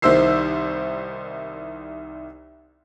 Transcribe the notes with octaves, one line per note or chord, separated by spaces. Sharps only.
C2 D#3 E4 C5 E6 C7